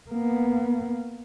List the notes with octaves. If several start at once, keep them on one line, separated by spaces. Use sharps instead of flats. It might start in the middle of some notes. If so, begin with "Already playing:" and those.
A#3 B3